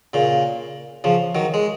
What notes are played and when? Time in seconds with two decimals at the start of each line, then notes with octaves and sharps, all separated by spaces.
0.13 A#2 C#3
1.04 C#3 F3
1.35 D#3 F#3
1.54 G#3